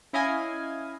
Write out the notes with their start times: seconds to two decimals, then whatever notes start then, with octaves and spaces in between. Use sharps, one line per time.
0.13 C#4 E4 D#5 F5 G#5